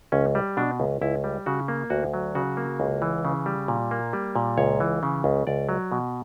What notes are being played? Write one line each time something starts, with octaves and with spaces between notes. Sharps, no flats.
C#2 C#4
G3
B2 D4
C#2
C#2 E4
G3
C#3 F#4
A#3
D2 F#4
F#3
C#3 F#4
A#3
C#2
E3
C#3
G3
A#2
A#3
G3
A#2
C#2 C#5
E3
C#3
C#2
C#2 D5
F#3
B2